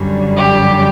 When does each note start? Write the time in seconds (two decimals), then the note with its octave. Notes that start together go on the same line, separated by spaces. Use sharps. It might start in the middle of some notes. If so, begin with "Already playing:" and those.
Already playing: F#2 D3 G3
0.36 G4